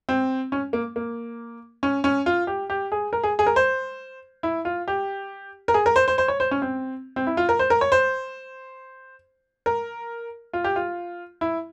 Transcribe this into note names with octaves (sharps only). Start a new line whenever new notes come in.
C4
C#4
A#3
A#3
C#4
C#4
F4
G4
G4
G#4
A#4
G#4
G#4
A#4
C5
E4
F4
G4
A#4
G#4
A#4
C5
C5
C5
C#5
C5
C#4
C4
C4
E4
F4
A#4
C5
A#4
C#5
C5
A#4
F4
G4
F4
E4